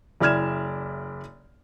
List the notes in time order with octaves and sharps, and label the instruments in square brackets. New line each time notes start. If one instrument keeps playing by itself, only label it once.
[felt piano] F#1 E4 D5 F6 G#6 E7